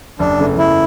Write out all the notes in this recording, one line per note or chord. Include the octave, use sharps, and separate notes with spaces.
F#1 D4
E2 C#3 E3 A3
F#1 E4